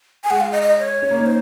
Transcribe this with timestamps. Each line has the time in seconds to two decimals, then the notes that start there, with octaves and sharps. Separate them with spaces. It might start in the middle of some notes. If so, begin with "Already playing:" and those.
0.24 G#5
0.30 G#3 F#5
0.40 F5
0.52 D#5
0.62 D#5
0.79 C#5
1.02 C#4
1.11 A#3
1.19 D#4
1.26 C5